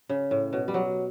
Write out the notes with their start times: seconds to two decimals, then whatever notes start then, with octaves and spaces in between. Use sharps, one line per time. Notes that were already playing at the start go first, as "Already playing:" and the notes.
0.09 C#3
0.31 A2
0.53 B2
0.68 G3
0.74 F#3